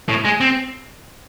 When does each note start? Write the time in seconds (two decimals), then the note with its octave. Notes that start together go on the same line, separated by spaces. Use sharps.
0.09 A2
0.25 G#3
0.41 C4